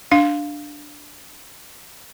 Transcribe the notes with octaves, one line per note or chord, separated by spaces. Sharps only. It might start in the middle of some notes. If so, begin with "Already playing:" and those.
D4 F5